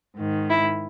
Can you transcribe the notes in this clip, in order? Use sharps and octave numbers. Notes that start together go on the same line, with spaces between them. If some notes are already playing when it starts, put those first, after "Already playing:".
G#2 D#3
E4